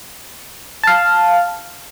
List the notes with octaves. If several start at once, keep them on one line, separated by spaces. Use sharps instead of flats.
F5 A5